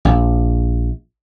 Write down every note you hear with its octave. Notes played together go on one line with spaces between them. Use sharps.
A#1